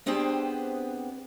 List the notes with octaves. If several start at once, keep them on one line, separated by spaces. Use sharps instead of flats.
B3 C4 D4 G4 G#4 C5